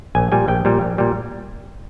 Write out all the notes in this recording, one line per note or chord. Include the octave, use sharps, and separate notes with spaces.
A#1 G#5
A#2 G3 G#5
A#1 G5
A#2 G3
A#1
A#2 G3